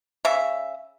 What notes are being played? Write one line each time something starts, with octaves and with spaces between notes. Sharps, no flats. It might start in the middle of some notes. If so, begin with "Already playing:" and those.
C#3 E5